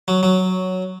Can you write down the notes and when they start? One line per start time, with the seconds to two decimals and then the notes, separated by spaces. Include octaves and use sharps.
0.08 F#3
0.23 F#3